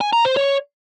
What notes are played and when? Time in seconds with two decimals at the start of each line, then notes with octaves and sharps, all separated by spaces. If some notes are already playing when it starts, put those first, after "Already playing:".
0.01 G#5
0.13 A#5
0.25 C5
0.37 C#5